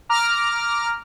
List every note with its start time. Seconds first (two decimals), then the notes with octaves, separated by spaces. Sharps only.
0.09 A#5 D6 F6